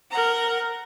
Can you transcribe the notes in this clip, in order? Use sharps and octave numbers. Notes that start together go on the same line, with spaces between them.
A#4 F#5 A#5